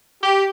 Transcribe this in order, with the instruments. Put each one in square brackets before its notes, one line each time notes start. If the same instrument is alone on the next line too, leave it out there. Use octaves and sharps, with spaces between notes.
[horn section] G4